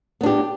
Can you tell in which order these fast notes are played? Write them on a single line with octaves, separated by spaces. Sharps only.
B3 D4 G4